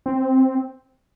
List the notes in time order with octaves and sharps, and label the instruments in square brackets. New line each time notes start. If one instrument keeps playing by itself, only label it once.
[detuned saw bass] C4